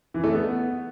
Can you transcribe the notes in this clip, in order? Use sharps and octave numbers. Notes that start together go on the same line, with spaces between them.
E3
A3
B3